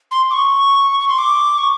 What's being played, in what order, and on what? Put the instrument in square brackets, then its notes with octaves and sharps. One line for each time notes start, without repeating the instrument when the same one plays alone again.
[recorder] C6
D6
C#6
C#6
C6
D6
C#6